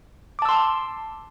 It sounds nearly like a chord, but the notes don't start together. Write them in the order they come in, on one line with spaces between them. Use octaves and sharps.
D6 A5 E6 C6